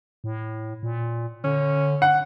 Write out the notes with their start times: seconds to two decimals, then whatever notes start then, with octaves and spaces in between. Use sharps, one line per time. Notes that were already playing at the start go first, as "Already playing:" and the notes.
0.24 A2
0.83 A#2
1.44 D3 C#4
2.02 F#5